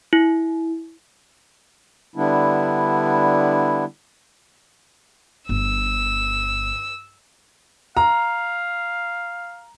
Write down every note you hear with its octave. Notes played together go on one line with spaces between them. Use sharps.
E4
D3 G3 B3 D4 E4
G1 E6
F5 A#5